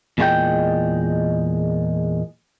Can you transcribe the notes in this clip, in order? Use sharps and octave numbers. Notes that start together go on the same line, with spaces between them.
E2 A#2 G#3 F4 D#5 G5